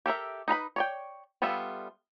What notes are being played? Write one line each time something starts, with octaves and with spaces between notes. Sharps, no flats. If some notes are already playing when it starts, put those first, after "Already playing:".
G4 A4 A#4 E5
D#4 B4 A#5 B5
C#5 D5 G5
G3 B3 F4 A4 E5